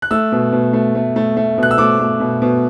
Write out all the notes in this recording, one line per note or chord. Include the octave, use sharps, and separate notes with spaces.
F#6
A3 E6
B2
B2
A3
A3
A3
A3
B2 F#6
E6
A3 D6
A3
B2
B2